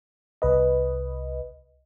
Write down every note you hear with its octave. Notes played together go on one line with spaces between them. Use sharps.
C2 B4 D#5